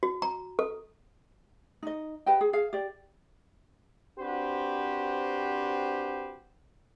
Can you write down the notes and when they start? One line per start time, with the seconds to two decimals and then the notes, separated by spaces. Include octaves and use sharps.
0.03 F#4
0.22 A#5
0.59 A4
1.83 D#4 D#5
2.26 G4 B4 D#5 G5
2.41 G#4
2.53 G#4 F5
2.73 G4 D5
4.19 C4 D4 F#4 G4 B4 C5